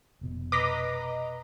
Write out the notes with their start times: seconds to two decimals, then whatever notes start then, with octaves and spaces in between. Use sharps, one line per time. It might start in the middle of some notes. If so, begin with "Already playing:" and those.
0.21 F1 B2
0.52 B4 D#5 A#5 D6 A#6 B6